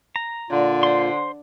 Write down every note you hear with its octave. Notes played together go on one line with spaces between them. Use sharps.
A#5
A#2 D3 F4
C5 C6